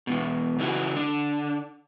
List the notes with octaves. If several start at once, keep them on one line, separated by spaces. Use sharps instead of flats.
E2 B2
C#3 E3 E4 F#4
D3 D4